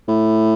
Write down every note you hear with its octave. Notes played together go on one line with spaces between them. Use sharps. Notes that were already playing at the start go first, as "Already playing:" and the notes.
A2